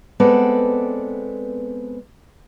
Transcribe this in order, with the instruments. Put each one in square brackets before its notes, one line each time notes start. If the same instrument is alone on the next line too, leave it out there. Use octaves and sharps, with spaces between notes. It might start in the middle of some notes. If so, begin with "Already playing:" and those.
[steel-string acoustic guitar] G#3 B3 C4 A4 B4 D5